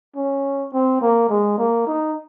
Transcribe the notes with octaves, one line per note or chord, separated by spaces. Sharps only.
C#4
C4
A#3
G#3
A#3
D#4